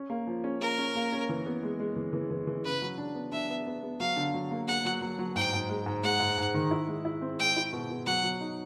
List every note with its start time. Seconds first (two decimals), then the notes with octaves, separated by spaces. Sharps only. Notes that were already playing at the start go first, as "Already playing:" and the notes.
Already playing: C#4
0.10 A#3
0.27 F3
0.44 C#4
0.61 A#3 A#4
0.78 C#4
0.95 A#3
1.12 C#4
1.29 E3
1.46 B3
1.63 G#3
1.80 G#3
1.96 E3
2.13 E3
2.31 E3
2.47 E3
2.65 C#3 B4
2.82 F#3
2.98 D4
3.15 B3
3.32 D4 E5
3.49 B3
3.66 B3
3.83 B3
4.00 F#3 F5
4.16 D3
4.34 F#3
4.51 A#3
4.68 A#3 F#5
4.85 F#3
5.02 F#3
5.19 F#3
5.36 G#2 G5
5.53 G#2
5.69 G#3
5.86 G#2
6.03 G#3 F#5
6.20 G#2
6.38 G#2
6.54 D#3
6.71 E4
6.88 G#3
7.05 E4
7.21 C4
7.39 G#3 G5
7.56 E4
7.73 B2
7.90 B2
8.06 F#3 F#5
8.23 F#3
8.41 D#4